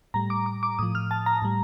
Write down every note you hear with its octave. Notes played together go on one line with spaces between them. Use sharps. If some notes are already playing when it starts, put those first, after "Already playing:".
A2 G3 A#5
D6
D6
D6
A2 F3 D#6
F6
A5
A#5
A2 G3